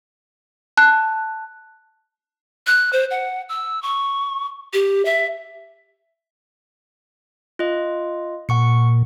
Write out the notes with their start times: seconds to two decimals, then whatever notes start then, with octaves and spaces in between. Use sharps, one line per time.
0.77 A5 F#6
2.67 F#6
2.93 C5
3.11 F#5
3.49 E6
3.83 C#6
4.73 G4
5.05 E5
7.59 F4 D#5
8.49 A#2 F#5 C#6 C#7